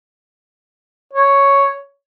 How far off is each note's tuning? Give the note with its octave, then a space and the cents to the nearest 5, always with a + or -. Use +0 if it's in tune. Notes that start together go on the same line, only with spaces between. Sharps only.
C#5 +0